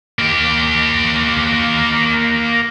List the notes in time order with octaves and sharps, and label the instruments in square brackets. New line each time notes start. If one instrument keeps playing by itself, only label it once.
[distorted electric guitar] A#3 G4